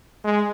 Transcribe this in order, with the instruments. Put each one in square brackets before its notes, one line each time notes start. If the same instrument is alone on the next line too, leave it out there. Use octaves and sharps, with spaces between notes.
[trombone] G#3